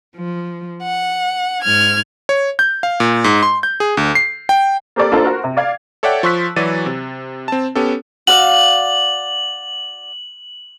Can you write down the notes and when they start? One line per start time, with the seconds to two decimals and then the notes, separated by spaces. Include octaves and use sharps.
0.17 F3
0.83 F#5
1.63 G#2 F6 G#6
2.29 C#5
2.59 G6
2.83 F5
3.00 A#2
3.24 G#2
3.43 C6
3.63 G6
3.80 G#4
3.97 D2
4.15 C7
4.49 G5
4.96 A#3 C4 G4 A4 D5
5.11 A#3 D4 F4 A4 A#4 C5
5.25 F#4 A#4 C5
5.44 C3
5.57 D5 F5 G#6
6.03 A4 C#5 D5 E5 F#5 G5
6.23 F3 C6 C#6 E6 F#6 B6
6.56 E3 F#3 F#4 D5 A6 D#7
6.86 C3
7.48 C4 A5
7.75 B3 C#4 G4 A4
8.27 F#4 D5 F5 F#7